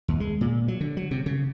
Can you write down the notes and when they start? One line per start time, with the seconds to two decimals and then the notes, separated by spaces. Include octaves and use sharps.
0.08 D#2
0.20 G#3
0.41 A#2
0.68 F#3
0.81 D3
0.97 F#3
1.11 C3
1.26 C#3